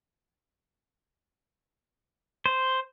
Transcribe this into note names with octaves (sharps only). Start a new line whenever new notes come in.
C5